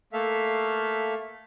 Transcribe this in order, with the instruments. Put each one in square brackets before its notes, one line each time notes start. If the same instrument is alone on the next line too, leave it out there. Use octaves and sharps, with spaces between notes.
[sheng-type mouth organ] A3 A#3 A4 E5 F5